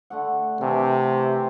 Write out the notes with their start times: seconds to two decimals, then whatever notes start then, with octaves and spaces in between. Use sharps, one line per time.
0.10 D3 A3 F#5
0.61 C3 E3 A3